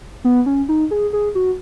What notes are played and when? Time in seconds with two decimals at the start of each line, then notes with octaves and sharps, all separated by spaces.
0.24 B3
0.46 C#4
0.69 D#4
0.91 G#4
1.13 G#4
1.35 F#4